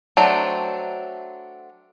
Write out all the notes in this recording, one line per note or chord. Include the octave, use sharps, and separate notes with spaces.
F#3 A3 C4 D4